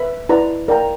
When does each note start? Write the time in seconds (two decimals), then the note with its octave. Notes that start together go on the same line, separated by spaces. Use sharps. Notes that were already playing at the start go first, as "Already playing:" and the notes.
Already playing: B4 E5 B5
0.29 E4 B4 D5 A#5
0.68 A#4 D5 G5 A#5